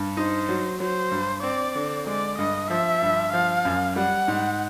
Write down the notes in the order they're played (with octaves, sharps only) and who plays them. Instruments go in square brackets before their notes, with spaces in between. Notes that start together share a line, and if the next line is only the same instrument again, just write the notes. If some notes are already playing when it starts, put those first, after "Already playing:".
Already playing: [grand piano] G2
[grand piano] D#4 [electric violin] C5
[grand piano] F#3
[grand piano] F#3 [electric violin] C5
[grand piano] G2
[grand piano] C4 [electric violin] D5
[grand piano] D3
[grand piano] G#3 [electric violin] D5
[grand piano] G2 [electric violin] D#5
[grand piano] F3 [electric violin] E5
[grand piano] G2
[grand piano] F3 [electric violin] F5
[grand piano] F#2
[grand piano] G3 [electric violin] F#5
[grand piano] G#2